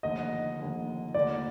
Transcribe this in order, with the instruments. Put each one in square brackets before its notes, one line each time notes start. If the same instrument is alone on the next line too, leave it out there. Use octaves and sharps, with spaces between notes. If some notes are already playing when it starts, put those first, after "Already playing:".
[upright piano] F1 D#2 D3 [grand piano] D#5
[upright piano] F1 D#2 D3
[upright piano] F1 D#2 D3 [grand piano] D5